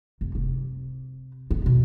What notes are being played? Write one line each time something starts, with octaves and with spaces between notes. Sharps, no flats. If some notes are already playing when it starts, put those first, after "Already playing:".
F1
C3
B3
B2